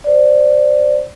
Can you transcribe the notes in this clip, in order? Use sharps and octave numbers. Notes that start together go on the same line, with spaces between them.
C5 D5